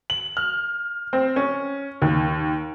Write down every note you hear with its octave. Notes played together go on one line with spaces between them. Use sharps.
F#7
F6
C4
C#4
D#2